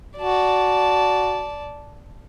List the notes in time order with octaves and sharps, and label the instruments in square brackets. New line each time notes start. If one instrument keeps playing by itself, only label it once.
[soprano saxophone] F#4 [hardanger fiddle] D5 A5